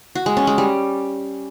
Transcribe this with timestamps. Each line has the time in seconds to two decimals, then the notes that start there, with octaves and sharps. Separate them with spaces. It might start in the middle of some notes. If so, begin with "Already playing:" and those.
0.15 F#4
0.26 G#3
0.37 C#4
0.47 G#3
0.58 G3